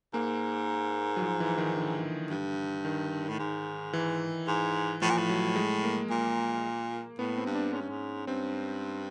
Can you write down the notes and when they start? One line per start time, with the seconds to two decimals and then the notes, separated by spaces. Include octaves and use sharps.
0.14 G#2 A#3
1.17 F#3
1.22 F3
1.40 E3
1.58 D#3
1.76 D3
2.30 G2
2.85 D#3
3.29 A2
3.39 G#2
3.93 E3
4.48 G#2
5.02 A2 F3
5.10 A#2
5.18 A2
5.29 F#3
5.56 G#3
5.83 A#3
6.10 A#2
7.19 A2 B3
7.37 C4
7.46 G2
7.55 D4
7.73 G#2 C#4
7.81 G2
7.90 G#2
8.27 G2 C4